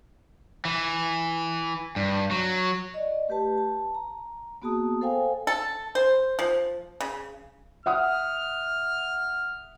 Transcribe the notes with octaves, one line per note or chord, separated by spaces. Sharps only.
E3
G2
F#3
D5 D#5
A3 G4 B4 A5
A5
A#5
A#3 B3 F#4 G#4 A5 D#6
A4 C5 F5 G5 G#5
A4
C5
F3
C#3
E5 F#5 D#6 F6